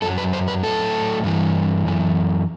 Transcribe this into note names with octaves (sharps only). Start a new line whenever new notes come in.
F#2 F#3 A4
B4
C5
B4
A2 F#3 A4
G2 E3
F#2 E3